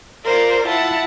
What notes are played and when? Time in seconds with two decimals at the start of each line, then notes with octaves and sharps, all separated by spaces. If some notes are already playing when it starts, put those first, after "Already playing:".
0.24 F4 A#4 C5 D5
0.66 E4 F4 F#5 A5